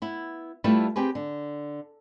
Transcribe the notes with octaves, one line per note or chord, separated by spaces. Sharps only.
B3 E4
G3 A3 E4 F4 A4 B4
C4 G4 G#4 B4
D3